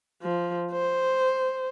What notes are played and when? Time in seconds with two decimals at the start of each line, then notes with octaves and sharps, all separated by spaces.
0.22 F3
0.72 C5